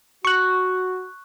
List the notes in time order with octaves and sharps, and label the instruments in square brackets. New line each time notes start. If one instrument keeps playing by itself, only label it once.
[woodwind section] F#4 [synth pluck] C#6 F#6